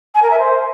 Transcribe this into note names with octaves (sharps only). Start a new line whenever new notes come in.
G#5
A#4
E5
C5